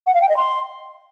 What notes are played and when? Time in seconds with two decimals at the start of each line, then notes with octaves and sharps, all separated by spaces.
0.06 F#5
0.14 F5
0.21 G5
0.29 D#5
0.36 C6